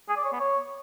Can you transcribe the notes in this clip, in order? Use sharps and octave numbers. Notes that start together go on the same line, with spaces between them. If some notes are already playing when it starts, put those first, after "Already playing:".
G#4
D5
C#5
B3
C#5